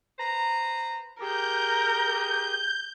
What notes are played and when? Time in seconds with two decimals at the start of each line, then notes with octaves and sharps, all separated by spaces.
0.19 B4 C5 A#5
1.21 G4 G#4 A#4 G6